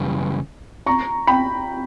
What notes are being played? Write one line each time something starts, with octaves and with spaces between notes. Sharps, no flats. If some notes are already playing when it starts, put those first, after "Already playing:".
Already playing: F#2 C#3 E3 G3
A#5 C#6
G5 B5